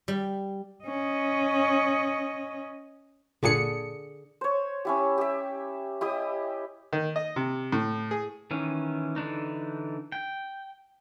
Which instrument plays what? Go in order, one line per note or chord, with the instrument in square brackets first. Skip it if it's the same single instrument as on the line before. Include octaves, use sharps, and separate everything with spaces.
[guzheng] G3
[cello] C#4 D#5
[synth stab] G1 A#2 C#7 [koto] D3 D4 G#4
[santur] C5 C#5
C#4 E4 G4
G4 E5
E4 G4 D#5 D#6
[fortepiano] D#3
D#5
C3
A2
G#4
[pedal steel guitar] D#3 E3 C#4
D3 E3 D4 D#4
G5